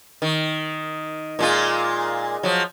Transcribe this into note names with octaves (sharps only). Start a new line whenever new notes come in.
D#3
A#2 G#3 F4
F3 F#3